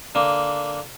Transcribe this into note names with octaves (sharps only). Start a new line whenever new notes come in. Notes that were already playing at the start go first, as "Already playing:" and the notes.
D3 A#3